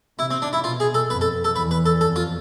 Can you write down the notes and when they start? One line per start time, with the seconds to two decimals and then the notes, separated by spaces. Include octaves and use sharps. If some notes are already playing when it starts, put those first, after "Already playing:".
0.19 C3 E4
0.30 C4
0.42 D4
0.53 E4
0.64 B2 F4
0.80 G#4
0.94 A4
1.10 F2 B4
1.21 A4
1.44 A4
1.55 E2 B4
1.71 B4
1.86 A4
2.01 F2 A4
2.16 F4